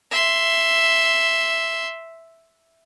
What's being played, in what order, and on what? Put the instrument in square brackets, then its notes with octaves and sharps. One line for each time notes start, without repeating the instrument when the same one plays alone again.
[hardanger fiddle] E5 C6